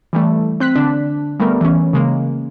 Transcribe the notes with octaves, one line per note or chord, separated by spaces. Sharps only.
E3 G3 A3
C4 F#6 B6
D3 D4
G3 A3 B3 A#4
E3 C#4
C#3 G#3 A#3